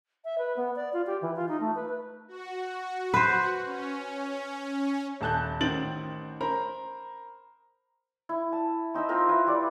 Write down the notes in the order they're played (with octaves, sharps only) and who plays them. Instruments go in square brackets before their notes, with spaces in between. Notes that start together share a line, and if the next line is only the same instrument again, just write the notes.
[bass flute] E5
B4
B3
D5
F4
G4
E3
F4
D#4
A3
B4
B4
[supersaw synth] F#4
[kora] B4 C5
[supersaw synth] C#4
[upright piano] D#1 A4 A5 F#6 G6
A1 D#3 C4 A6 D7 F#7
A#4 C5 A#5 B5
[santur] E4
A5
C4 D#4 B5 E6
C4 F4 A#4
E4 B4 F5
G3 D5